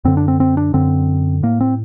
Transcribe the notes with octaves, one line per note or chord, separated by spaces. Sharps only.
F#2 D3 C4
D4
C4
C4
D4
F#2 D3 C4
A2 A#3
C4